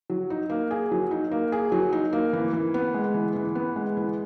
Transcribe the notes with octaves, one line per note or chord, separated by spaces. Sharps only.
F#3
D#4
A#3
G#4
F#3
D#4
A#3
G#4
F#3
D#4
A#3
E3
E3
B3
G#3
E3
E3
B3
G#3
E3